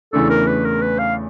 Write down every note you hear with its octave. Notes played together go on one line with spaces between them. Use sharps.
E2 C#3 E3 A3 D4 A4
A#4
B4
A#4
B4
F5